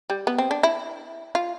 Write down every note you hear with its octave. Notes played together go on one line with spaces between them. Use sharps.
G3
B3
C4
D4
E4
F4